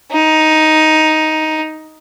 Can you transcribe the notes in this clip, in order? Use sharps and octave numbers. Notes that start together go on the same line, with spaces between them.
D#4